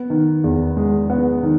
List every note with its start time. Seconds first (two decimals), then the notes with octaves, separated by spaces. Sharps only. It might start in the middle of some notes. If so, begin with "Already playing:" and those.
Already playing: B3
0.10 D#3
0.44 E2
0.77 G#3
1.10 B3
1.43 D#3